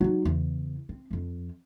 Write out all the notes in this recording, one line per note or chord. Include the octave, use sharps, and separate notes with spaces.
F#3 D#4
E2 C#3
C4
F2 F3